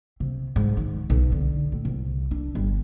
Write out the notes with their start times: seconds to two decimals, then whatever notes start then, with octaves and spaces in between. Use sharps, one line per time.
0.20 C3
0.56 G#2
0.77 D#3
1.10 B1
1.32 D3
1.72 A2
1.85 C2
2.31 D4
2.55 G1